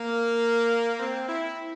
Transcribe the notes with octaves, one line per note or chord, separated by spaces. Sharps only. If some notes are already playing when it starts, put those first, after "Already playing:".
Already playing: A#3
C4
E4